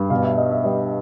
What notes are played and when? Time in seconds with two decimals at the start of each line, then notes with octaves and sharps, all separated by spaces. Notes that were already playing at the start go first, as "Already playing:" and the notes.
Already playing: G2 G3
0.10 B2 F5
0.24 E5
0.37 G3 D#5
0.51 E5
0.64 G3 D#5